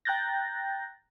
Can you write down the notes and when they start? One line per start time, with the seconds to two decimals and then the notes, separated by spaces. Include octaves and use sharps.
0.05 G5 A#5 F#6 G6 A6 A#6